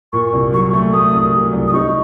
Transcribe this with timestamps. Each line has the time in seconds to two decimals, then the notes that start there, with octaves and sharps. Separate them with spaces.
0.13 A#2 C#6
0.33 C2
0.53 F#3 C#6
0.73 A3 C#6
0.93 A3 D#6
1.13 C2
1.33 F#3
1.53 C2
1.68 D#6
1.74 D#4 C#6